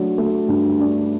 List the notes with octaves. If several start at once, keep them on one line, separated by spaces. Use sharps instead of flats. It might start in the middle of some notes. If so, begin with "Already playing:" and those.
Already playing: F#3 A3 D4
A3
G2
D4